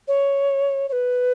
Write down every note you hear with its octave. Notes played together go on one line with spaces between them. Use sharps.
C#5
C#5
B4